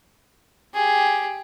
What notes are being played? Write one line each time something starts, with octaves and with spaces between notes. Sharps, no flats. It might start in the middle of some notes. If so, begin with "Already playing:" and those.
G4 G#4